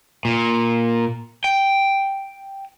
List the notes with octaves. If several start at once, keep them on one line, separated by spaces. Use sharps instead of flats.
A#2
G5